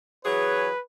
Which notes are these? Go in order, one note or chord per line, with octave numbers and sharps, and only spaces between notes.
E3 F#3 G#4 B4 C#5